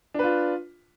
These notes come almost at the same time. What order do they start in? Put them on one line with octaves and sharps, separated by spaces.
D4 B4 F4